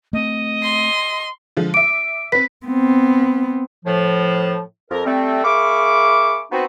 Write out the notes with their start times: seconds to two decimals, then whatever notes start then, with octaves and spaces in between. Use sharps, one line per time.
0.13 A3 C4 D#5
0.63 C6
1.57 D3 F3 G#3
1.74 E5 D6 D7
2.32 C4 B4 B6
2.66 B3 C4
3.85 A2 F3
4.90 F2 A#4
5.05 G3 A3 C4
5.44 A#3 G#4 E5 B5 C#6 D6
6.51 B3 C4 D#4 F#4